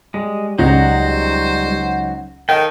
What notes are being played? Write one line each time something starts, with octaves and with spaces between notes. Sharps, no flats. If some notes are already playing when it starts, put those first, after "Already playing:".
G3 G#3
C#2 F#3 D#4 F#4 C5
D#3 A4 G5